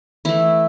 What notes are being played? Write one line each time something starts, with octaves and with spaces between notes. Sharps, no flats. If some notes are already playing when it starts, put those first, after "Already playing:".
E3 A3 E4